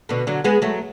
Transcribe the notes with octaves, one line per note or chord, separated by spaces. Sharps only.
B2 D3
D3 F#3
G#3 B3
F#3 A3